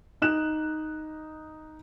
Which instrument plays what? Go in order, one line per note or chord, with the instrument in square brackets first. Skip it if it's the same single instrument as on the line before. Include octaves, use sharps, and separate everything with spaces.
[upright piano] D#4 F#6 E7